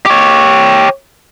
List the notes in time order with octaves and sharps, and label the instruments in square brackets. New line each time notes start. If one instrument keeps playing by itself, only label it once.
[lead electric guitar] G4 C#5